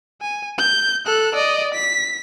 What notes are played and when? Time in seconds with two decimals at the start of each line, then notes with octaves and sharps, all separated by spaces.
0.21 G#5
0.58 G6
1.06 A4 F#6
1.34 D5 D#5
1.74 B6